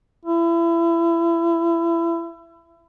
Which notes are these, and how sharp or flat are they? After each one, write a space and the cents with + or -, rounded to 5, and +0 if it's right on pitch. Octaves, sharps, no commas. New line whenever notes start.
E4 +30